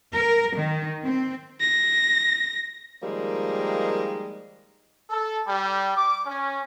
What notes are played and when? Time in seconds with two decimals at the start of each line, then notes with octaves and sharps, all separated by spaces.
0.13 A#4
0.57 D#3
1.04 C4
1.61 A#6
3.03 D#3 F3 G3 G#3 A#3
5.09 A4
5.47 G3
5.96 D6
6.26 C#4